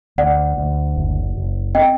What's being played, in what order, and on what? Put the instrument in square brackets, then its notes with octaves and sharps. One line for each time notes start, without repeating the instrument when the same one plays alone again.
[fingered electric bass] D2 [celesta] D5 F#5
[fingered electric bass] D2
F#1
F#1
[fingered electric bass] C4 [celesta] D#5 G5